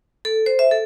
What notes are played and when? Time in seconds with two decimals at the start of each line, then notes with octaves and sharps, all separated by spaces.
0.25 A4
0.46 C5
0.59 E5
0.71 A4